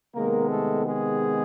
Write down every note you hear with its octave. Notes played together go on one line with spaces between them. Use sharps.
C3 D#3 G#3 A#3 B3 A#4
A3 A4
G#3 G#4